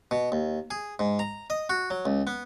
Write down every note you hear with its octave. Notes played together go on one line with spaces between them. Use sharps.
B2
D#2
G#4
G#2
A#5
D#5
F#4
F#3
C#2
B3